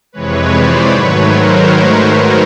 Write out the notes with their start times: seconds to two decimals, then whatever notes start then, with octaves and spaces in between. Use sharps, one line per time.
0.12 F2 C3 E3 G#3 B4 C#5
0.51 C5 D5
0.88 G#2 D#3 F#3 A3 B4 C#5
1.25 A#4 C5